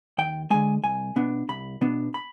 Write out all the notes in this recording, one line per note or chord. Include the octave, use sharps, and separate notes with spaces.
D#2 G5
D3 G#3 G#5
C2 G#5
B2 B3 D4
C2 B5
B2 B3 D4
B5